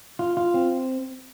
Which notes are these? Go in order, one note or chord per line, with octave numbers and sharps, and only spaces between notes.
F4
F4
C4